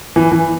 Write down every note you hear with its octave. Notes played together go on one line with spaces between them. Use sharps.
E3
E3